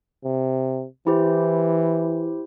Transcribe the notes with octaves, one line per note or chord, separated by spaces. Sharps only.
C3
E3 E4 G4 C5